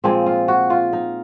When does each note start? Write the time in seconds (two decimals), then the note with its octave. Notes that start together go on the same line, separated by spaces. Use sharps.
0.04 A#2 F3 G#3 C4
0.26 F4
0.48 F#4
0.70 F4
0.93 D#4